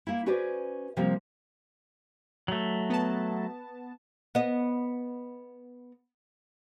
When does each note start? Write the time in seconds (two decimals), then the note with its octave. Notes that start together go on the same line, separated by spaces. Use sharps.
0.07 A#3 E4
0.26 C#4 F#4 G#4 B4 C5 D5
0.97 C3 F3 G3 A#3 C4
2.48 F#3 A3
2.90 B3 A5
4.35 B3 D#5